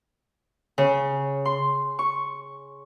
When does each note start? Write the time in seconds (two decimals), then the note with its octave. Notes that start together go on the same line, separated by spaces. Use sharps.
0.78 C#3
1.46 C6
1.99 C#6